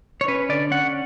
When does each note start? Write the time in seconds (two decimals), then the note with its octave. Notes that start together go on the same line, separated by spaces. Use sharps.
0.21 C#5
0.28 C#4 B4
0.49 D3 D5
0.71 C#4 F#5